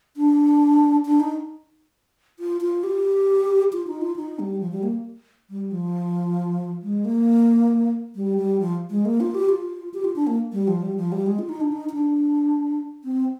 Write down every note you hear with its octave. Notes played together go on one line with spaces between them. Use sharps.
D4
D4
D#4
F4
F4
G4
F4
D#4
F4
D#4
G3
F3
G3
A#3
G3
F3
G#3
A#3
G3
G3
F3
G#3
A#3
F4
G4
F4
G4
F4
D4
A#3
G3
F3
G3
F3
G3
G#3
F4
D#4
D4
D#4
D#4
D4
C4